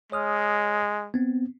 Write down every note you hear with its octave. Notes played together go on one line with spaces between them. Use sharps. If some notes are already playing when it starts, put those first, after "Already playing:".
G#3 C#5 D#6 F6
B3 C4